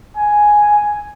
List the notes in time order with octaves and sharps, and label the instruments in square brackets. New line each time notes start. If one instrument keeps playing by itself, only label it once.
[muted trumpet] G#5